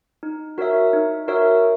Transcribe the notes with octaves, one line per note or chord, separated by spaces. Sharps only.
D#4
F#4 A#4 C#5 E5
D#4
F#4 A#4 C#5 E5